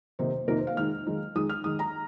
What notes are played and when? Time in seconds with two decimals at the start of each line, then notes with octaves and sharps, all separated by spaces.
0.19 C3 D#3 A#3 D#4 C5
0.48 C3 D#3 A#3 D#4 A#4
0.58 C5
0.67 F5
0.77 D#3 G#3 D#4 F6
1.07 D#3 G#3 D#4
1.35 D#3 G#3 D#4 D#6
1.49 F6
1.64 D#3 G#3 D#4 D#6
1.79 A#5